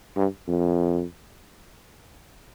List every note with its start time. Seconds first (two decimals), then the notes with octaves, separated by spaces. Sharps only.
0.17 G2
0.48 F2